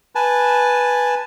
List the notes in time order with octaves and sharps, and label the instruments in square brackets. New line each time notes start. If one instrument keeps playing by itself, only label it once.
[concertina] B4 G#5 A5